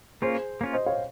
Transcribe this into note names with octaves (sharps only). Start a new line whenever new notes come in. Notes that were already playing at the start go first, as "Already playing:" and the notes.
A#3 C#4 F4 G#4 C5
A#3 C#4 F4
C5 D#5
C#5 F5